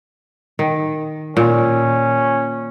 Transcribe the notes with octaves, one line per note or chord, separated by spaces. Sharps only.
D#3
A#2 C#4